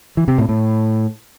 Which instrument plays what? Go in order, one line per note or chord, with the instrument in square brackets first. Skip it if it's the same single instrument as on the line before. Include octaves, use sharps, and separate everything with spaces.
[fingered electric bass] E3
C3
A2
A2